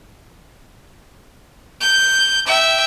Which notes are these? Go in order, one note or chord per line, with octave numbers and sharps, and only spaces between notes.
G6
E5 G5